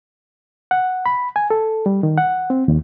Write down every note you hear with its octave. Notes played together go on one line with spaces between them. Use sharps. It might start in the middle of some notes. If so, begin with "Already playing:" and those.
F#5
B5
G#5
A4
G3
D#3
F#5
C4
D#2